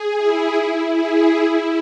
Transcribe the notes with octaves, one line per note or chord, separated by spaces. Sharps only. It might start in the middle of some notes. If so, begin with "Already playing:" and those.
Already playing: G#4
E4
E4
G#4
E4